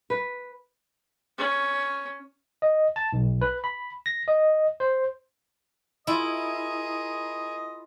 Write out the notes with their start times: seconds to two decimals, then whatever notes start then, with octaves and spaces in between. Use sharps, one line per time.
0.10 B4
1.38 C#4
2.62 D#5
2.96 A5
3.13 B1
3.41 B4
3.64 B5
4.06 A#6
4.28 D#5
4.80 C5
6.07 E4 F4 G#4 A#4 D#5 B5